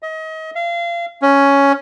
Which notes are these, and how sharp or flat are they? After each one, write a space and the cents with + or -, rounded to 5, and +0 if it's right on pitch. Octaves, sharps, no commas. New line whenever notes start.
D#5 +35
F5 -30
C#4 +5